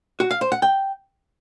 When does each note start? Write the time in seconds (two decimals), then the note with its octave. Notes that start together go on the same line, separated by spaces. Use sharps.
0.20 F#4
0.31 F5
0.41 C5
0.52 F#5
0.62 G5